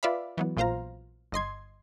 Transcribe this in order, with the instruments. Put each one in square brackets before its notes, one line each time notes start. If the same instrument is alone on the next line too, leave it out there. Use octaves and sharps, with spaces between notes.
[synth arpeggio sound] F4 B4 D5 E5 F5 B5
E3 F#3 B3
A#1 A#2 F4 C5 F5 A#5
G1 D#5 C6 G#6